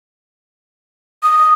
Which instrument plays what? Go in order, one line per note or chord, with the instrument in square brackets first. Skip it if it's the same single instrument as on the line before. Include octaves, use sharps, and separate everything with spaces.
[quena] D#6